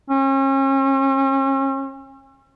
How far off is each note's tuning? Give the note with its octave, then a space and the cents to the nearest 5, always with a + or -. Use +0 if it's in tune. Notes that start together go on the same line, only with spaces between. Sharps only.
C#4 -40